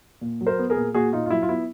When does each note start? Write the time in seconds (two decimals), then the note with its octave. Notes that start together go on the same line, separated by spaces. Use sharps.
0.21 A#2
0.41 F#3
0.47 A#4 C5
0.59 B3
0.70 G#4 A#4
0.76 A#2
0.94 A#2 F#4 G#4
1.13 A#2 D#4 F4
1.26 F4
1.30 F#3 E4
1.42 F4
1.49 B3 E4